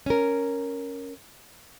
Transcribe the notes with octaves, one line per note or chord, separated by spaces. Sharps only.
C#4 A#4